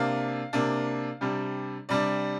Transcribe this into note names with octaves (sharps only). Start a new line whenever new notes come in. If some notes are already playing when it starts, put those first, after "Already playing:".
Already playing: C3 A#3 D4 F5
C3 A#3 D4
C3 G3 D4
C3 G3 D4 D5